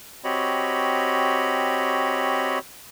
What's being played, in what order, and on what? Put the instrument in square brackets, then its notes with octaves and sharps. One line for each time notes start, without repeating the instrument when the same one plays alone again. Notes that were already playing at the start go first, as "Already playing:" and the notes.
[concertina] C4 F#4 G4 C#5 D#5 B5